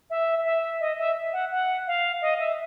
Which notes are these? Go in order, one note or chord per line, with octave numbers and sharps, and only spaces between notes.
E5
E5
D#5
E5
F#5
F#5
F5
D#5
E5